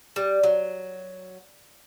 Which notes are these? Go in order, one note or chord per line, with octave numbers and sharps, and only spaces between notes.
G3
F#3